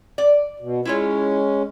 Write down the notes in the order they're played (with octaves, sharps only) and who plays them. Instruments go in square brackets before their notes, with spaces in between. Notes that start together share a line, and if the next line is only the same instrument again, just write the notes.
[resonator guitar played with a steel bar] D5
[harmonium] B2
[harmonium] G#3 C#4 [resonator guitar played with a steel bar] E4 F4 C#5